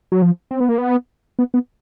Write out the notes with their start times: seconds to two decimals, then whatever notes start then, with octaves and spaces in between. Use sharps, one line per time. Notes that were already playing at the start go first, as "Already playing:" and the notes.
0.12 F#3
0.22 F3
0.51 C4
0.60 B3
0.69 A#3
0.78 B3
1.39 B3
1.54 B3